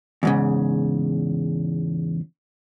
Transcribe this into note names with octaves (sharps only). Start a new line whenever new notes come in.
E2 G#2 C#3